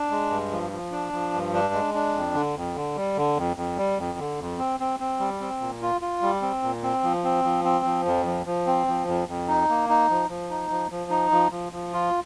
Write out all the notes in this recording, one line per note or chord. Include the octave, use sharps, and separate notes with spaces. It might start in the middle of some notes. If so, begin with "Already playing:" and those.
Already playing: D4
G#3
G2
F3
F3
D4
F3
G2
D4
G#3
D4
F2
D3
F2
D3
G3
D3
F2
F2
G3
F2
D3
F2
C4
C4
C4
G3
C4
A#2
F4
F4
G3
C4
A#2
C4
F3
C4
F3
C4
F3
F2
F3
F3
C4
F3
F2
F2
D#4
A#3
D#4
F3
F3
D#4
F3
F3
D#4
F3
F3
F3
F4